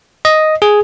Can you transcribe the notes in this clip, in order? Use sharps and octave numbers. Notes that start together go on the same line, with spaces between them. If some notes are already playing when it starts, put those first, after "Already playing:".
D#5
G#4